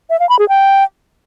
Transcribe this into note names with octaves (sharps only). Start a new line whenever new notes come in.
E5
F5
B5
G#4
G5